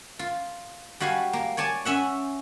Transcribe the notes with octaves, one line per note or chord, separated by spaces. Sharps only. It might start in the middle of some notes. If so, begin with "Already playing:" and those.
F4
G3 F#4 F5 G#5
A#3
C#5 D5 G#5 A5
C#4 E5 F#5